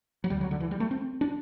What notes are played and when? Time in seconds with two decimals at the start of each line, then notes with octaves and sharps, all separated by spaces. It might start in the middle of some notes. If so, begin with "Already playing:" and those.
0.24 F#3
0.30 D2 D3 G3
0.41 F#3
0.51 D3
0.60 E3
0.71 G3
0.80 A3
0.91 C4
1.21 D4